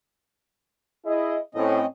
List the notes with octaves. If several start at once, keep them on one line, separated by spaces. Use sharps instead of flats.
E4 G#4 D#5
A2 C4 C#4 D#5